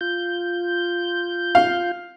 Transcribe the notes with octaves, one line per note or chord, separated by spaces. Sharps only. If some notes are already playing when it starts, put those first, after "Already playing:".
F4 G6
F5